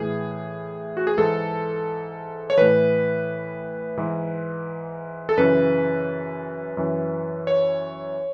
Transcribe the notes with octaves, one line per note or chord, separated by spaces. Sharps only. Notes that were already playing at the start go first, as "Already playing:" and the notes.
Already playing: A2 E3 G#4
F#4
G#4
G#2 E3 A4
C#5
A2 E3 B4
G#2 E3
A4
F#2 C#3 E3 B4
F#2 E3
C#5